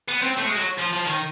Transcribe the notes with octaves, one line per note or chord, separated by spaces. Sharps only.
B3
C4
A3
G#3
F#3
F3
F3
D#3